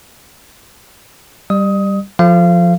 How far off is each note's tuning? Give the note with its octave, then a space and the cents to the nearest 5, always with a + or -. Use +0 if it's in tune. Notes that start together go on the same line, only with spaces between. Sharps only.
G3 +0 D5 +45 D#6 +20
F3 +10 A4 +5 F5 -30